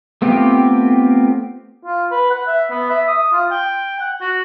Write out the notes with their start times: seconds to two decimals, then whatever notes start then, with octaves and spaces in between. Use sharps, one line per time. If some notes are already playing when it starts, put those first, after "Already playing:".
0.22 A3 B3 C4 F4 G4
1.84 F4
2.11 B4
2.30 F#5
2.47 E5
2.70 B3
2.90 E5
3.08 D#6
3.33 F4
3.51 G5
4.01 F#5
4.21 F#4